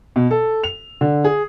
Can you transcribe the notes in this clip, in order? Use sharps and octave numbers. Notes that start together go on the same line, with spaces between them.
B2
A4
F7
D3
G#4